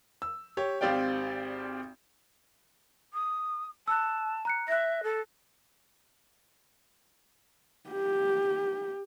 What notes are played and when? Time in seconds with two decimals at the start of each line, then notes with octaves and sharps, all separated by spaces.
0.22 E6
0.57 G4 C#5
0.81 G#1 C4 G4 D5 F5 G5
3.13 D#6
3.88 A5 E6 F#6
4.45 A#5 F#6 C#7
4.68 E5 F#6 A#6
5.03 A4
7.90 G4